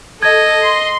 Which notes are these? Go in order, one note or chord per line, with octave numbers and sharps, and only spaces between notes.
A4 D#5 G#6
C6